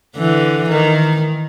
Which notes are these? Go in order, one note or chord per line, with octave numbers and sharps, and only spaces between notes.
D3 E3
D#3